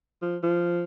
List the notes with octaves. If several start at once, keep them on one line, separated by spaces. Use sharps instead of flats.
F3
F3